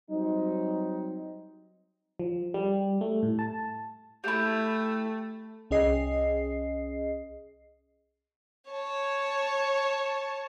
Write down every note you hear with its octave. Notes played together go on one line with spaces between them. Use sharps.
F#3 G3 C4 D#4
F3
G3
A3
A2
A5
A3 E4 G4
C2 C#4 G#4 D#5 C7
C#5 A5